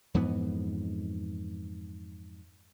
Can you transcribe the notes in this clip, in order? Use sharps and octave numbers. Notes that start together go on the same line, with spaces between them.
F2 G#2 E3 B3